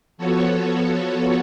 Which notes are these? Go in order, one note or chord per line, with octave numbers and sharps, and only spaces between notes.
F3 B3 F#4 A4 C#5